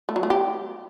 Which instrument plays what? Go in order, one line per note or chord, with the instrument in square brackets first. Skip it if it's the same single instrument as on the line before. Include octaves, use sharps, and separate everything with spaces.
[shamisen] A3
F#3
A3
G4